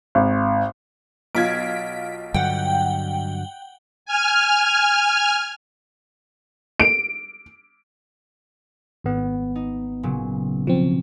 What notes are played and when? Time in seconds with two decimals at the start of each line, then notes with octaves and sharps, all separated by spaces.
0.15 G#1
1.35 B1 F4 G#6 B6 D7
2.34 G2 D3 F#3 F#5 G5
4.06 G#5 F6
6.80 D7
9.04 G#1 B3
9.55 D#4
10.03 A#2 C#3 F#3
10.67 B2 F3 C4